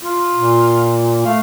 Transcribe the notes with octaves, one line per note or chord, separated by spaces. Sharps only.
F4
A#2
A3 F5